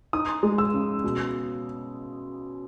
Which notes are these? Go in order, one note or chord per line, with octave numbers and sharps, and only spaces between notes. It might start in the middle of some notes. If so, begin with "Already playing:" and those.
D#4 D#6
G#3
E6
C#3
B2